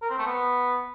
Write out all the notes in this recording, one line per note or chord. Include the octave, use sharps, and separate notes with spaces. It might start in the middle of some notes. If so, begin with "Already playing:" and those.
A#4
C4
A3
B3